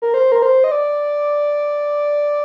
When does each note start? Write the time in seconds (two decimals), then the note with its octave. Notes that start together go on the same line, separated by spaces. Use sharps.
0.02 A#4
0.14 C5
0.32 A#4
0.42 C5
0.64 D#5
0.72 D5